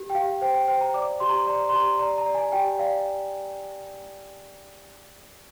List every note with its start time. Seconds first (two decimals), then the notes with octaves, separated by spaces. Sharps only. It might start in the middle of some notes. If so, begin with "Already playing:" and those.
Already playing: G4
0.10 G5
0.15 G4 F5
0.42 C5 G5
0.54 G5
0.68 C5 G5
0.81 A#5
0.94 D5 D6
1.20 G4 C6
1.29 A#5
1.47 D5 A#5
1.69 C6
1.73 G4 A#5
1.99 D5 A#5
2.18 A#5
2.26 D5
2.35 G#5
2.52 G4 G5
2.79 D5 F5